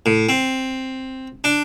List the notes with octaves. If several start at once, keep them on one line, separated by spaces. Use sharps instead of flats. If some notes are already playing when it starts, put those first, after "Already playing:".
A2
C4
D4